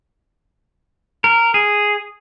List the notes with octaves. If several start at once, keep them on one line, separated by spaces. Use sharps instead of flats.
A#4
G#4